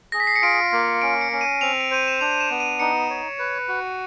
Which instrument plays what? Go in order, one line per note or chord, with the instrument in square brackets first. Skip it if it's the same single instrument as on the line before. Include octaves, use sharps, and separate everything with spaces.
[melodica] G#4 [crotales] A#6
[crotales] B6
C7
C#7
[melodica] F4 [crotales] D7
[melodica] A#3
[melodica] C#4 [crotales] D7
[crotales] C#7
[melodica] C#4
[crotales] D#7
[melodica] C4 [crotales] F7
[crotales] D7
[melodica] C5 [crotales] D#7
[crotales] E7
[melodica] D4 [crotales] F7
[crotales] D#7
E7
[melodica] B3
[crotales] D#7
[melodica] D#4 [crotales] C#7
[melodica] C#5
B4
F#4